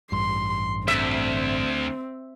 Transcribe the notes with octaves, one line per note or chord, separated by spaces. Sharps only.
A1 G2 C6
D2 C4 E5